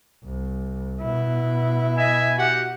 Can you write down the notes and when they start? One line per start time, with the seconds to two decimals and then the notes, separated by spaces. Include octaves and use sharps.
0.24 C2
1.02 B2 E4
1.98 D#5 E5 G#5
2.38 F#4 G4 F#5